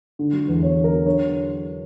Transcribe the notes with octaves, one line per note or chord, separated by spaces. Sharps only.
D3
F#3
E2
B3 C#5
D3
A#4
F#3
D3 C#5